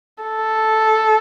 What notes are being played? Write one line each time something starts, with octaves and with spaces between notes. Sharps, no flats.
A4